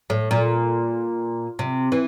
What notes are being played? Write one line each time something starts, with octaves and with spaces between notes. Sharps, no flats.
A2
A#2
C3
E3